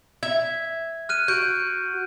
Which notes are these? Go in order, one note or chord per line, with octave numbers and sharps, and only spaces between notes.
E5 G#6
F6 F#6 D#7
F#4 G6 D7